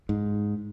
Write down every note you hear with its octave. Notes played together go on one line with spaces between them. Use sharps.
G#2